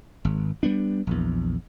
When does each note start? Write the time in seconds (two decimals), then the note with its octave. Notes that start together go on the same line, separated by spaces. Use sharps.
0.25 G#1
0.63 G3 B3 D4
1.07 A#1 E2